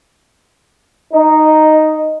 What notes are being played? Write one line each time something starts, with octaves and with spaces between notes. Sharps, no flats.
D#4